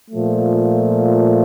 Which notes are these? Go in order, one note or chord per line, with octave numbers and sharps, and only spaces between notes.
A#2 F3 A3